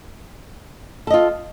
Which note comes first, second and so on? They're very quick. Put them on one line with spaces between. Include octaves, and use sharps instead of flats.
A4 D#5 F4